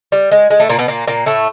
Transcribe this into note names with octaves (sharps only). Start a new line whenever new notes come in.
G3
G#3
G#3
A2 A3
A#2 A#3
B2 B3
A#2 A#3
A#2 A#3
A2 A3